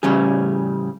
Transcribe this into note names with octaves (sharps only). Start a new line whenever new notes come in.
A2 C#3 G3 C#4 G#4